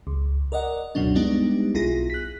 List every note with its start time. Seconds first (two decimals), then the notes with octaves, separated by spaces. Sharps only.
0.07 C#2
0.52 A#4 D5 D#5 F#5
0.95 C#2 F#2 B2 F#3 D4
1.15 G3 G#3 B3 D4 D#4 G4
1.74 B1 B2 E4 F4 G#4 A#6
2.10 F#6 B6